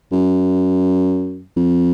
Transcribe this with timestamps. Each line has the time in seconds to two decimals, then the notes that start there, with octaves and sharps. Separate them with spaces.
0.12 F#2
1.56 F2